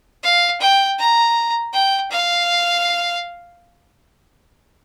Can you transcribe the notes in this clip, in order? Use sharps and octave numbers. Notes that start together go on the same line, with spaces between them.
F5
G5
A#5
G5
F5